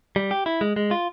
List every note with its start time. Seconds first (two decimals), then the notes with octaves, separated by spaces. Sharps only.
0.16 G3
0.31 G4
0.46 E4
0.61 G#3
0.76 G#3
0.91 F4